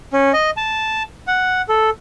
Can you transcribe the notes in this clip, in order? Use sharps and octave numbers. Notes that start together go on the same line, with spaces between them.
C#4
D#5
A5
F#5
A4